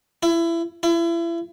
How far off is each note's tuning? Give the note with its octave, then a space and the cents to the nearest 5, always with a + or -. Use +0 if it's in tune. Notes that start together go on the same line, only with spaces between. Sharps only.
E4 +25
E4 +35